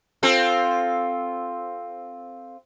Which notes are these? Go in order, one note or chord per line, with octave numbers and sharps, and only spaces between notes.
C4 F4 A4